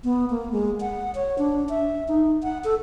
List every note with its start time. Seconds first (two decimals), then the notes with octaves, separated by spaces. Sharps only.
0.04 B3
0.30 A#3
0.52 G#3
0.81 F#5
1.15 C#5
1.38 D4
1.69 E5
2.08 D#4
2.43 F#5
2.64 A4